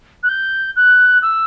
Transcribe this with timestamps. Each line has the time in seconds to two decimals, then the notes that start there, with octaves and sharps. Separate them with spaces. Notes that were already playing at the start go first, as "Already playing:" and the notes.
0.23 F#6
0.29 G6
0.76 F#6
1.22 E6